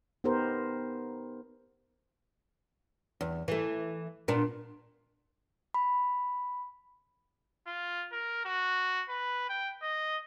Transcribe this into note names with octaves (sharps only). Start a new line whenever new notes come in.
B3 D#4 G4 A#4 C5
E2
E3 A3
A#2 B3 D4
B5
F4
A#4
F#4
B4
G5
D#5